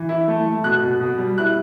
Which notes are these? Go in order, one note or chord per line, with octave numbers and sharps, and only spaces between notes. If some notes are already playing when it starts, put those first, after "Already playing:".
Already playing: E3
E4
A3
A3
B2 F#6
B2
B2
G3
E4 F#6